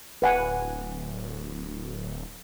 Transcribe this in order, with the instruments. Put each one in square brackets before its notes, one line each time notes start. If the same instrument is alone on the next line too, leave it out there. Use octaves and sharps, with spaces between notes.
[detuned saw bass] D1 [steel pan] B4 F#5 G#5